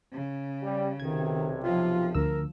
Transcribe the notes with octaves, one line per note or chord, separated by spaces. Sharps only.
C#3
G3
B1 C3 D#3 G#6
F3 F4
D2 A#4 E6